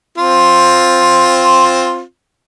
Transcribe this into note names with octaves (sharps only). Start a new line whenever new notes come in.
C4 F4